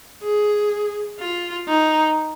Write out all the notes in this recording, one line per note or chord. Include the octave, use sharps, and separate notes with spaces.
G#4
F4
D#4